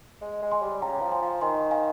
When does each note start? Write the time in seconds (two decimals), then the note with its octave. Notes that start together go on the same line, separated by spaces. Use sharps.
0.22 G#3
0.42 G#3
0.52 G#5 C6
0.62 G3
0.82 C#3 G5 A#5
1.02 F3
1.11 G#5 C6
1.22 F3
1.41 D#3 G#5 C6
1.71 F5 G#5